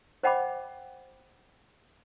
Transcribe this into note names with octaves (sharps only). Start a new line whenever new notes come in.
C5 D#5 F#5 G5 B5 D6